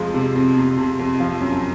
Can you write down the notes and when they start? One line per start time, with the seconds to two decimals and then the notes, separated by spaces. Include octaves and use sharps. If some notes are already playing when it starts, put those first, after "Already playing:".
Already playing: F2 C3 F3 G#3
0.14 C3
0.35 F2
0.57 C3
0.78 C3
0.99 F2
1.20 F3
1.41 F#2